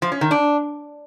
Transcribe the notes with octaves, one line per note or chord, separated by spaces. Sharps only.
F3
C#4
D#3
D4